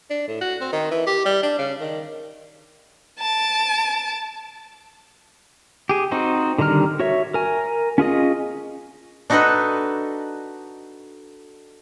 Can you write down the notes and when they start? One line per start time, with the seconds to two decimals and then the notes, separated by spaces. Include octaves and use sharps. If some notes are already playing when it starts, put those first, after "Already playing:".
0.10 D4
0.28 A2
0.41 F#4
0.61 C4
0.72 D#3
0.91 E3
1.06 G4
1.25 G3
1.43 D4
1.58 C#3
1.80 D#3
3.20 A5 D7
5.89 G4 G#4
6.12 C4 D#4 F#4 C5
6.58 D3 D#3 G3 A#5 F6
7.00 F#4 C#5 E5
7.34 A#4 G#5
7.98 C#4 F4 G#4 D#5
9.30 D4 D#4 F#4 A4 B4 D#5